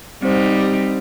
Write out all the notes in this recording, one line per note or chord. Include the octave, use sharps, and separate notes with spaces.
G3 C4 D#4 C5